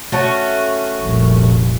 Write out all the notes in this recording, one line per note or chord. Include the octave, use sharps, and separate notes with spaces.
A3 C#4 F#4
F1 C2 A#2